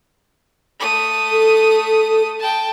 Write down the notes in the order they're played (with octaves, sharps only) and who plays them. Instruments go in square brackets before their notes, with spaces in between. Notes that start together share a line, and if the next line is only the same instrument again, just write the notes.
[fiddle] A3 D#6
[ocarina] A4
[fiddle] G5 A5